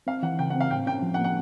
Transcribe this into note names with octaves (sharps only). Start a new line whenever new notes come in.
C4 F5
E3 F#5
C#3 G5
F#5
C4
F5
A2 G5
C#4 G5
F3
F#5
A#3
F#5